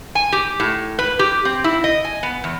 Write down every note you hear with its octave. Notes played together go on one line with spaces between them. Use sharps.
G#5
G4
A2
B4
G4
C4
E4
D#5
G#5
B3
E2